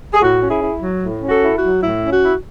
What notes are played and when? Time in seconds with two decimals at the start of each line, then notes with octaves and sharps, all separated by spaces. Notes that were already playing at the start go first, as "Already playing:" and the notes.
0.14 G#4
0.21 A2 F#4
0.41 C#4
0.49 E4 G#4
0.62 E4
0.82 F#3
1.02 A2
1.22 C#4
1.29 F#4 A4
1.42 E4
1.56 F#4
1.63 F#3
1.83 A2 E4
2.03 C#4
2.11 F#4
2.24 E4